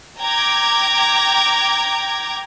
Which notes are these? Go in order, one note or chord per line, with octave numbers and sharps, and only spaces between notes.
G5 A#5 D6 G#6